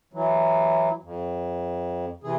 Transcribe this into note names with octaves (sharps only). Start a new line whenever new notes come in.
E3 F#3
F2
C3 E3 G#4